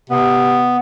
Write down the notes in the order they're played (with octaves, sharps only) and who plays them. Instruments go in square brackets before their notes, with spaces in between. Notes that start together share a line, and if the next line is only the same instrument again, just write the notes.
[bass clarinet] C3 [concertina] B3